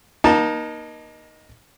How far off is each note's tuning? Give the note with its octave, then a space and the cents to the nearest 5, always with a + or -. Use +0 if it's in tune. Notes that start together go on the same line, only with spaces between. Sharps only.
A#3 +30 D#4 -5 A5 +0